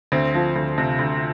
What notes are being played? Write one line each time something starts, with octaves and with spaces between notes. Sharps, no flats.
D2 C4
F3
D2
C3
D2